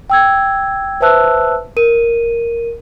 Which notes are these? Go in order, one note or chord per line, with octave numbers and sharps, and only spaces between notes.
G5 E6 G#6
B4 C5 E5 A5 E6 F#6
A#4 D#7